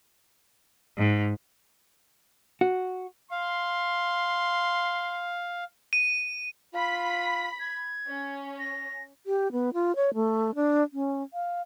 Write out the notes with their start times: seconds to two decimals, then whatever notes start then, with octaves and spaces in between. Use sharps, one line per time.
0.97 G#2
2.61 F#4
3.31 F5 C6
5.93 D#7
6.73 F4 B5 B6
7.60 G#6
8.08 C#4
8.59 A#6
9.26 G4
9.52 B3
9.74 F4
9.96 C#5
10.14 A3
10.55 D4
10.93 C#4
11.34 F5